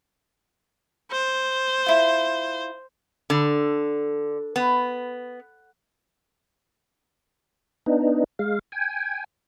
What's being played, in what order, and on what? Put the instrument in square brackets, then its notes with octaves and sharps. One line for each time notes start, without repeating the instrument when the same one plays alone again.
[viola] C5
[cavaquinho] E4 F4
[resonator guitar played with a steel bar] D3
B3
[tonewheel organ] B3 D4 D#4
G#3 F5
G5 G#5